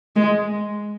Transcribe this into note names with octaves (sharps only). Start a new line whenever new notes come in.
G#3